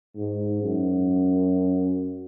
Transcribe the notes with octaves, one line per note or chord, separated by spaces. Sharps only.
G#2
F#2